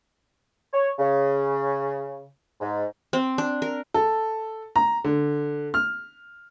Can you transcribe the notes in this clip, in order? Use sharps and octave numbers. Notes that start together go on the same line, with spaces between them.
C#5
C#3
G#2
C4
D4
A#4
A4
A#5
D3
F6